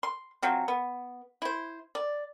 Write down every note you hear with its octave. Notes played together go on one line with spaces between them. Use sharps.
C6
F3 F#3 C4
B3
E4 C5
D5